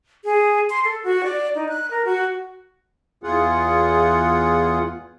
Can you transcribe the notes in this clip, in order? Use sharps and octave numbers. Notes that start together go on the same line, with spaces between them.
G#4
C6
A4
F#4
D5
D#4
F#6
A#4
F#4
E2 F4 G#4 F#5